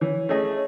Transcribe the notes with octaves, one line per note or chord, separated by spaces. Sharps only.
E3 C#5
A3 C#4 G#4 D#5